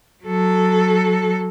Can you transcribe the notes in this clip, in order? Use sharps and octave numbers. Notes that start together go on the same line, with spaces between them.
F#3 A4